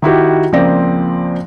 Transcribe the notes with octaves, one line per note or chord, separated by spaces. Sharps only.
D#3 E4 F#4 G4
C#2 F3 A#3 C4 D5 A#6